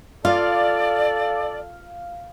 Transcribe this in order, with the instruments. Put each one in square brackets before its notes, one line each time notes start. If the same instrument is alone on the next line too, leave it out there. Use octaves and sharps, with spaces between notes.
[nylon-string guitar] F4 [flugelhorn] A4 [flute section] D5 [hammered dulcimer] F5